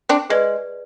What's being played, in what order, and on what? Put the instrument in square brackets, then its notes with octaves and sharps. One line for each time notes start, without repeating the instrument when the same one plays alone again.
[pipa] C4 D4
[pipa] G#3 [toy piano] G#4 B4 D5